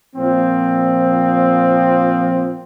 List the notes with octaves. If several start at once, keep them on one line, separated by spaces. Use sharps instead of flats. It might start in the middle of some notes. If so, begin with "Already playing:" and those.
A#2 F3 C4